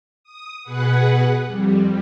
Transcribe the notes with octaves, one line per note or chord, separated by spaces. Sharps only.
D#6
B2 G#4 B4 F#5
F2 G3